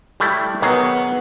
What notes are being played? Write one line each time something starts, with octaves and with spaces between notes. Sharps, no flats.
G3 A3 E4
D#3 F#3 B3 G#4